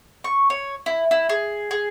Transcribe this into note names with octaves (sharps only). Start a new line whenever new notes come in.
C#6
C#5
E4
E4
G#4
G#4